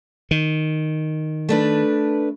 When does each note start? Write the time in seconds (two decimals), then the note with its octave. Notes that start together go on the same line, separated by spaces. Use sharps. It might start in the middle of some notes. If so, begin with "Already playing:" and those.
0.31 D#3
1.49 A3 D4 B4